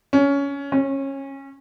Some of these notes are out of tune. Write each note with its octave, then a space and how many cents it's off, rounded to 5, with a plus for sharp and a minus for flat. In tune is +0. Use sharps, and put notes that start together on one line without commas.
C#4 +20
C#4 -20